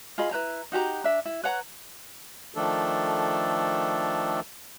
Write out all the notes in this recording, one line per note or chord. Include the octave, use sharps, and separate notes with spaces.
F4 G#4 D#5 B5
E4 B4 C5 A#5
D#4 F#4 G4 A#5
D4 E5
E4
B4 C#5 F#5 A#5
D#3 F3 A3 D4 A4